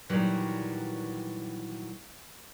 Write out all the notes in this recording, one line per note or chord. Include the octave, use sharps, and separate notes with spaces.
A#2 D#3 E3 F#3 G3 F#4